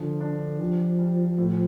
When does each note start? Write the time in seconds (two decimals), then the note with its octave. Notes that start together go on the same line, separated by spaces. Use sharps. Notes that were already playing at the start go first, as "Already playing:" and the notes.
Already playing: D3 F3
0.20 D4
0.59 F3 G3
0.99 G3
1.38 A2